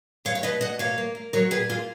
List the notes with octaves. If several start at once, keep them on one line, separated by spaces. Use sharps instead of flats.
B2 C#5 F5
C#5
B2 B4 D#5
B2 D#5 F#5
A#3 C#5 F5
A#3
A#3
F#3 A#4 C#5
A#2 G#4 B4
A#3 F4 G#4